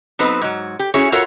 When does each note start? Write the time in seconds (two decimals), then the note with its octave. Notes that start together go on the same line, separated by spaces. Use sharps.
0.19 F#3 B3 C4 D#4 B4
0.42 G#2 F#3
0.79 G4
0.94 C#4 E4 F#4 G#4 C#5
1.12 F4 F#4 A4 A#4 C#5 E5